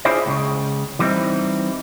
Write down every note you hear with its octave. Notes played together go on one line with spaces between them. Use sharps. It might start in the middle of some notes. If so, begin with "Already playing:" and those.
D4 E4 F4 G#4 C5 D5
C#2 A#2 C#3
E3 G3 B3 C4 D#4 E4